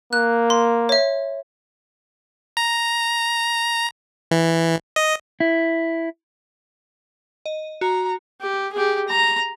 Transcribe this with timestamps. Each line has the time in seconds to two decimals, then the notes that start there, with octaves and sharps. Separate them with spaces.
0.13 A#3 F#6
0.50 C6
0.89 C#5 E5
2.57 A#5
4.31 E3
4.96 D#5
5.40 E4
7.46 D#5
7.81 F#4 A#5
8.41 G4
8.73 G4 G#4
9.08 A#5